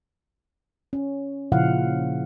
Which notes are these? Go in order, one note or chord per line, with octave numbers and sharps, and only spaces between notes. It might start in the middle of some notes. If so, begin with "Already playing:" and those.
C#4
A#2 C#3 F3 E4 F5 F#5